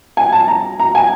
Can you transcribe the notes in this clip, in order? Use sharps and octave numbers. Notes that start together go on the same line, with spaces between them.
G#5
A5
A#5
A#5
G#5